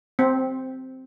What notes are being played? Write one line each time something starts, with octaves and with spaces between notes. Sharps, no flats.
C4